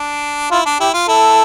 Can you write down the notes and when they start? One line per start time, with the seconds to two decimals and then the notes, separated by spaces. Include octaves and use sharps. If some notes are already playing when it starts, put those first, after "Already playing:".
Already playing: D4
0.51 E4 F4
0.66 D4
0.80 E4 G4
0.94 F4
1.08 E4 A4